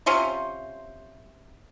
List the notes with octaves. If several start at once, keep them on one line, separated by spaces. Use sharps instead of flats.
C3 C#4 F4 C5